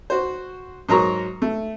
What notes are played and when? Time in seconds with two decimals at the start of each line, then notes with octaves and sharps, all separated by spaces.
0.10 F#4 C5
0.89 G#2 F#3 A#4 A#5 C#6
1.42 A3